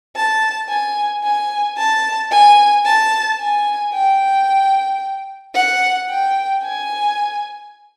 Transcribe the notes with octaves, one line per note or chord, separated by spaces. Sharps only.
A5
G#5
G#5
A5
G#5
A5
G#5
G5
F#5
G5
G#5